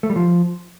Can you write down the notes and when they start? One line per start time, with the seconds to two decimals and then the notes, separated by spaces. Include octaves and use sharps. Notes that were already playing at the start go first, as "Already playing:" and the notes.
0.03 A3
0.10 G3
0.16 F3